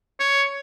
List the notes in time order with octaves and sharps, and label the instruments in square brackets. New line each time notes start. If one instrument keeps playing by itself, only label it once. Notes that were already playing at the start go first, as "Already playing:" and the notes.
[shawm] C#5